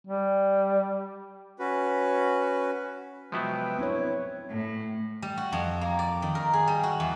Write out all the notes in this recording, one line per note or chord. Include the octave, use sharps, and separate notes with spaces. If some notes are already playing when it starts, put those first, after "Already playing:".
G3
C#4 F#4 B4
C3 F3 F#3 G#3 B3 B4 E5 G5
C4 D4 E4 C#5
A2
G3
F#4
F2
A#3
D5
D#3
A#4
G#4
G3
F#4
E2